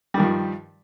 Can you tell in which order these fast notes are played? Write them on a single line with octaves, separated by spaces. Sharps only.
G3 D#3 G2 F3